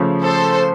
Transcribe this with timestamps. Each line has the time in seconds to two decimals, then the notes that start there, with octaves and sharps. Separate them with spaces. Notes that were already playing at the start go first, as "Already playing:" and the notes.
Already playing: C#3 F3 A3
0.24 A4 C5